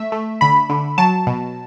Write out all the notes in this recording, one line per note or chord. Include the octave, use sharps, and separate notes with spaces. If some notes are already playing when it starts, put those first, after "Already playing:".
Already playing: A3 E5
A3
D3 B5
D3
F#3 A5
B2